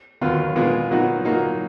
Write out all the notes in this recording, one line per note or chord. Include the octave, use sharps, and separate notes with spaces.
D#2 D#3 F#3 B3 F4
A#2 G#3 B3 F4 G#4
A#2 F#3 B3 D#4 F#4
A#2 F#3 A#3 D#4 F#4